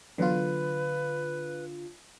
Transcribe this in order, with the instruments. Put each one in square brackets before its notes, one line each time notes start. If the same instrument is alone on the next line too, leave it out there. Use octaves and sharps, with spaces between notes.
[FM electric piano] D3 F4 [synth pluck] E3 F#3 B3 [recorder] B4